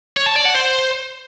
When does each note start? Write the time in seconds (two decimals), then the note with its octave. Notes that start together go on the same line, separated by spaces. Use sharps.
0.17 C#5
0.26 A5
0.36 D5
0.45 F#5
0.54 C5